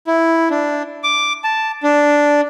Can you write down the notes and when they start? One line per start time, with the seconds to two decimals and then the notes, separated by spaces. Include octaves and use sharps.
0.07 E4
0.50 D4
1.04 D6
1.44 A5
1.83 D4